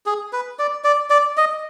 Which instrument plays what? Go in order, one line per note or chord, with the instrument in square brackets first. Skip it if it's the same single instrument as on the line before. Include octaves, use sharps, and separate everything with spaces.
[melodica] G#4
B4
D5
D5
D5
D#5